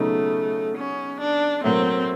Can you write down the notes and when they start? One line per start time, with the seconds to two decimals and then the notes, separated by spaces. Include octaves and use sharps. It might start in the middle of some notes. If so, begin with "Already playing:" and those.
Already playing: C#3 F#3 A3 B3 D#4
0.77 C#4
1.20 D4
1.64 A2 F#3 A#3 C4